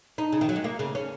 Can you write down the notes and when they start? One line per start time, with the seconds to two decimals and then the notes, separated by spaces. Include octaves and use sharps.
0.18 D#4
0.32 C#3
0.41 D#3
0.49 F#3
0.56 G#3
0.64 A#3
0.79 C#3
0.95 C#4